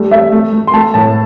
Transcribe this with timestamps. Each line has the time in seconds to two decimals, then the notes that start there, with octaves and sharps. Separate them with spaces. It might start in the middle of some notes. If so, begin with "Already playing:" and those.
Already playing: G3 A3
0.11 A3 E5
0.32 A3
0.53 A3
0.67 C6
0.73 A3 A5
0.94 A2 A5